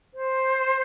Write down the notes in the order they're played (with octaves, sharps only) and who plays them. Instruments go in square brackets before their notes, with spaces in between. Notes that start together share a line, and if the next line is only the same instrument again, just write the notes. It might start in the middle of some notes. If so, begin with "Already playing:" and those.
[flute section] C5